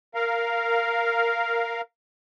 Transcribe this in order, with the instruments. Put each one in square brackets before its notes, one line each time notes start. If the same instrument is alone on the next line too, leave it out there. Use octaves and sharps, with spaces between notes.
[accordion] A#4 F5